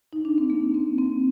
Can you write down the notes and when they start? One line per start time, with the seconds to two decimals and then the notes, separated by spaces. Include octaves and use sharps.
0.13 D#4
0.25 D4
0.38 C4
0.50 A#3
0.74 C4
0.98 C4